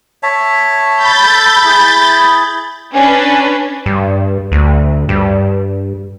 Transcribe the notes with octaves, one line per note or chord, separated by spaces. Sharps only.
C#5 E5 A5
B5 G6 A6
A4 A5
E4 G#4
C#4 D4 B4 G#5
G2
D2
G2